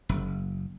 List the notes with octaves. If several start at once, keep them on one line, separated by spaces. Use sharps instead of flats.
F#1